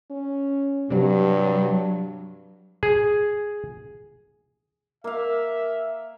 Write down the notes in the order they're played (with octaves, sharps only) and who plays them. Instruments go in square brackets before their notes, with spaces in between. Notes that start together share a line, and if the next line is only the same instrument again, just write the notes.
[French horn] C#4
[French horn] G2 [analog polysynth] C3 G3 [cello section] F#3
[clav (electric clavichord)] G#4
[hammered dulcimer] A#3 F5 [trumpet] E5